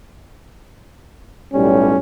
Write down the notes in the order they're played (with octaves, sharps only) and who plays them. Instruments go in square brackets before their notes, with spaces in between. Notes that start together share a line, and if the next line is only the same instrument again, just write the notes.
[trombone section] B1 A2 G3 [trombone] C#4